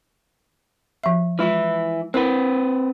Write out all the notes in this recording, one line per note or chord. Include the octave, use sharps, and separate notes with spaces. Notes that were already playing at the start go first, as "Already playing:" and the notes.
F3 E5
E3 G#3 E4 F4
C4 E4 A#4 B4